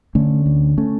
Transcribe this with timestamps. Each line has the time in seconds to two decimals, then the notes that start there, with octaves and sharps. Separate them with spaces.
0.15 D3 A3 C#4
0.46 D2
0.78 A3 C#4